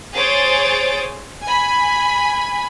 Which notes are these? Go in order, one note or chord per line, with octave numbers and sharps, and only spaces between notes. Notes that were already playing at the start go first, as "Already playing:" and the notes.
G#4 C5 C#5 D#6 A6 D7
G#5 B5